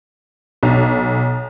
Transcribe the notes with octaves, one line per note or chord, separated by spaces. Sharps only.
B1